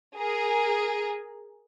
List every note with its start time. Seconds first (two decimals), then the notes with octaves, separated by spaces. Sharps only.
0.17 G#4 A#4